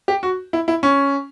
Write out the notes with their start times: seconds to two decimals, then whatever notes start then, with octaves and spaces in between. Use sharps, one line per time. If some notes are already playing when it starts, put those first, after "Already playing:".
0.08 G4
0.23 F#4
0.53 E4
0.68 E4
0.83 C#4